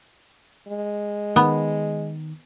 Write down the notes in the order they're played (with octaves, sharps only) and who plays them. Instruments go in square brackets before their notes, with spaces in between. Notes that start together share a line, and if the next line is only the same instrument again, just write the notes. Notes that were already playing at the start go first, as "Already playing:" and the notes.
[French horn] G#3
[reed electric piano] D#3 [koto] B3